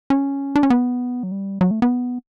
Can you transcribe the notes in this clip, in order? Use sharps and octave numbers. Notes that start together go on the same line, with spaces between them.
C#4
D4
C#4
B3
F#3
G3
F#3
A3
B3